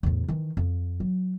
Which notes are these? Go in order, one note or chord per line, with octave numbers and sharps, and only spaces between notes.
E2 A2
D#3 E3
F2
F#3